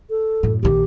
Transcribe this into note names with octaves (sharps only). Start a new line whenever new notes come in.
A4
F#2 A2
A#1 D#3 G4